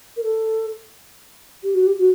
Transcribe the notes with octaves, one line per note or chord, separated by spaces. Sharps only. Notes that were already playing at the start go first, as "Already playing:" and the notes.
A#4
A4
G4
F#4
G4
F#4